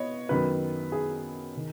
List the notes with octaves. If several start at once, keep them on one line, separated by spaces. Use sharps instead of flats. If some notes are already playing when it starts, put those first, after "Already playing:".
Already playing: B3 C#5 D#5
F#2 D#3 F#3 B3 B4
G#4
D#3